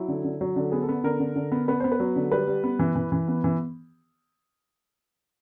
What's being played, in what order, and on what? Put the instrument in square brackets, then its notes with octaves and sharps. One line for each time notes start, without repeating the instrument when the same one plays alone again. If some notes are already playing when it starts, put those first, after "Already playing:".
Already playing: [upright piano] F#3 E4
D3
D3
F#3
D3
B3 G#4
A4
B3
D3 A#4
D3
D3
B3
B3 B4
B3 C5
B4
F#3
D3
G3 B4
G3
B3
E3
E3
E3
B3
E3